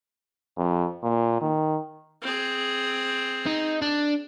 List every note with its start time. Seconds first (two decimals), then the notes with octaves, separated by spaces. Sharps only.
0.57 F2
1.03 A#2
1.41 D#3
2.22 C4 G#4
3.47 D#4
3.82 D4